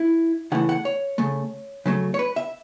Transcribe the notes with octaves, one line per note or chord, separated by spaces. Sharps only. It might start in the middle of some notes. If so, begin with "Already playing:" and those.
Already playing: E4
C#3 E3 A3 F#5
F#5
C#5
C#3 A3
C#3 F#3 A3
C#5
B4
E5